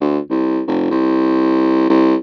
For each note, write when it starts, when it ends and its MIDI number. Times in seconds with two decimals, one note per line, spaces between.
0.01 0.19 38
0.30 0.62 36
0.67 0.90 29
0.91 1.89 36
1.89 2.15 36